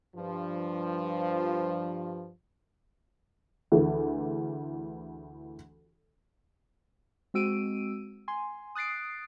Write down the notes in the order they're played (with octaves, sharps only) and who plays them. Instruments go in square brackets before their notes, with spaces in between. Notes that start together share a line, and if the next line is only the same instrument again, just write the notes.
[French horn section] G2 F3
[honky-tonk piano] D2 E3 G#4
[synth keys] G#3 C4 F#4 E6 D7 D#7
G#5 C6
D#6 F#6 A6 C7 D7